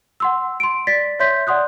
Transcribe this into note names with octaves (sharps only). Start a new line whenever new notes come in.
F#5 C6 E6
C6 D7
D5 A6 B6
C#5 E5 C6 G6 B6
D5 F#5 C6 D#6 F#6